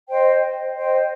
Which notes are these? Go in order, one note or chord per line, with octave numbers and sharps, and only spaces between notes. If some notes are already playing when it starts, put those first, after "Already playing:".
C5 D#5 G5
C5 D#5 G5